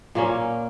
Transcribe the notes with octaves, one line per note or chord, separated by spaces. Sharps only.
A#2 A#3 C#4